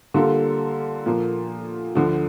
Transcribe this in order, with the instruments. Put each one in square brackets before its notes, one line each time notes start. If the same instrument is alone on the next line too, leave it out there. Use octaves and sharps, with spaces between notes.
[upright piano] D3 G3 A#3 F4 A4
A#2 F3 A#3
D2 D3 F3